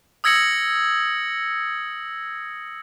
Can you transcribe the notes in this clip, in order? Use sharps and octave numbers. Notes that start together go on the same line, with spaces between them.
D#6 E6 G#6 A#6 C#7 F#7